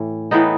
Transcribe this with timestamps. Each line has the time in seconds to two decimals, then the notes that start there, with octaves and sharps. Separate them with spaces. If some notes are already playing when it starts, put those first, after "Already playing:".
Already playing: A2 E3
0.31 A2 E3 B3 D#4